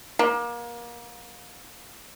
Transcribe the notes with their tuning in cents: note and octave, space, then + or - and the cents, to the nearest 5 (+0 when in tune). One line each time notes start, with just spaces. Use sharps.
A#3 +30